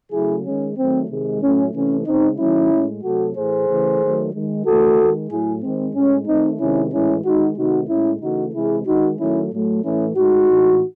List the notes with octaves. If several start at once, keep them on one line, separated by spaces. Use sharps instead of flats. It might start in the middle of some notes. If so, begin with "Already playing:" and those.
C#3 F#3 A3 E4 G#4
D#3 G#3 C#4
D#3 F#3 A3 C4
C3 D#3 G#3
A2 F#3 A3 C#4
C3 E3 A3 C#4
C#3 G#3 C4 D#4
D#3 F#3 A3 C#4 E4
A2 G#3
C3 F#3 A3 F#4 A4
A2 E3 A3 G#4 C5
C#3 E3 A3
D#3 F#3 A3
D#3 G#3
C#3 E3 A3 F#4 A4
D#3 G#3
A2 F#3 A3 E4 G#4
D#3 G#3 C4
A2 G#3 C#4
D#3 A3 C4 D#4
C3 D#3 G#3 C#4 E4
A2 E3 G#3 C#4 E4
D#3 G#3 D#4 F#4
C3 D#3 A3 D#4 F#4
A2 G#3 C#4 E4
C#3 E3 A3 D#4 F#4
C3 E3 G#3 E4 G#4
D#3 G#3 D#4 F#4
D#3 F#3 A3 C#4 E4
A2 F#3 A3
A2 E3 A3 C#4 E4
A2 G#3 D#4 F#4
A2 E3 G#3